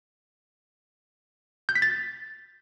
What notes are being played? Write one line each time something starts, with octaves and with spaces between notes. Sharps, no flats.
G6
B6
A6